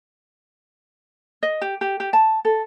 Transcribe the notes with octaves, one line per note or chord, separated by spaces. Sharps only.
D#5
G4
G4
G4
A5
A4